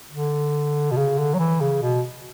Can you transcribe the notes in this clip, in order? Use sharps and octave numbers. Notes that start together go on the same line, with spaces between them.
D3
B2
C#3
D3
F#3
E3
C#3
B2